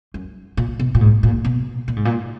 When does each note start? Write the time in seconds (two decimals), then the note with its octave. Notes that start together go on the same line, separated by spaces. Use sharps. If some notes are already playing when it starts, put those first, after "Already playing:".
0.14 F#2
0.57 A#2
0.80 B2
0.95 A#2
1.01 G#2
1.23 A#2
1.45 B2
1.88 A#2
1.96 G#2
2.05 A#2